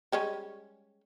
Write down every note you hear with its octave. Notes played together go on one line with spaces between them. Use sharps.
G3 G#3 C#4